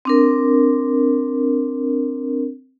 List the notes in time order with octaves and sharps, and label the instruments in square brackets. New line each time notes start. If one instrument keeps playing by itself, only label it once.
[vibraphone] C4 D4 A#4